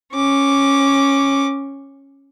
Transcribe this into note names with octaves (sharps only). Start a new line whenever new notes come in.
C#4 D6